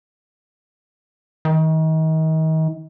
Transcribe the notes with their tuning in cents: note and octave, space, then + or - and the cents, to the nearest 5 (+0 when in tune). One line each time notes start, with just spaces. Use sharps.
D#3 +35